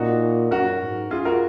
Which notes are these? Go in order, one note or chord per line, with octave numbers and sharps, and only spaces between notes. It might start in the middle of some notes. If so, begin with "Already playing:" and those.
Already playing: A#2 D#4 F#4
F#2 F#4 A#4
G#2
F#2 F4 G#4
F#4 A#4